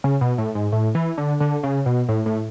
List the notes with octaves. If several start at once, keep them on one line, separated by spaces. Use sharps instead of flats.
C#3
B2
A2
G#2
A2
E3
D3
D3
C#3
B2
A2
A2